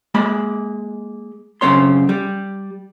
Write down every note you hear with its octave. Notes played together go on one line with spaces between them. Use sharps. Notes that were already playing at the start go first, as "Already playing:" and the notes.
G#3 A#3 B5
F#2 C#3 F3 C4 C#5 C6
G3